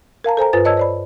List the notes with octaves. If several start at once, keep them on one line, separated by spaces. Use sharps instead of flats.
A#4 F5 A5 A#5
A4 C5 G#5 A#5
G2 F4 B4 C5 A6
C#5 D#5 A5 E6 G#6
C5 D5 B5